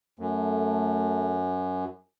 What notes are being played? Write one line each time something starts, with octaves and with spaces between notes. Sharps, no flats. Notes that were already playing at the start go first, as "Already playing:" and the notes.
F#2 A3